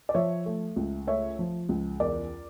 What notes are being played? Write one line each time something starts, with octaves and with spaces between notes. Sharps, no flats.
D5
F3 C#5 E5
A3
C#2
A3 C#5 E5
F3
C#2
E2 A#4 D5